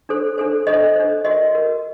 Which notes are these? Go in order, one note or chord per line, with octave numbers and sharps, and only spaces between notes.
D4 A4 C5
D4 A4 C5
D4 A4 C5 D#5
D4 A4 C5
F#4 A#4 D#5
F#4 A#4